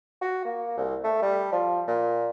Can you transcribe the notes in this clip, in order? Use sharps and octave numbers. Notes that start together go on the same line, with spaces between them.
F#4
A#3
C2
A3
G3
F3
A#2